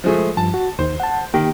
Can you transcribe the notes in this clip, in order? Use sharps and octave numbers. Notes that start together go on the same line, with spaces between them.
F3 G#3 A3
G2 F3 A5
F#4
D#2 D#3 C5
F#5 A5
D#3 A#3 G4